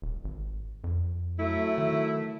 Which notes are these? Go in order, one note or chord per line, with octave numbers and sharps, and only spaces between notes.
D#1
G#1
F2
F#3 A3 E4
D#3